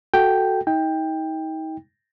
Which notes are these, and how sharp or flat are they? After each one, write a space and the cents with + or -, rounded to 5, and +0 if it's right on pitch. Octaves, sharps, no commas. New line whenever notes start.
F#4 +0 A4 +0 G5 +0
D#4 +35 G5 +15